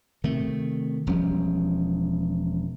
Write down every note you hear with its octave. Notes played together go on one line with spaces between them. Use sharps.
C3 D#3 A3
E1 F3 G3 C#4